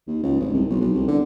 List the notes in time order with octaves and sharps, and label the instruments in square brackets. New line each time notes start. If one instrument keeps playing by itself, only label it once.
[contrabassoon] D#2
C#2
G#1
C2
B1
B1
C2
D3